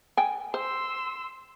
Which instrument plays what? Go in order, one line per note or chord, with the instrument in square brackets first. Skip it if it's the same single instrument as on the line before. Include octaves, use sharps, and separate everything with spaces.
[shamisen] G5 G#5
[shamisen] C5 [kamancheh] C6 E6